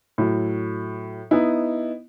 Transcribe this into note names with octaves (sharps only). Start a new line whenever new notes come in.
A2 F#3
B3 D#4 E4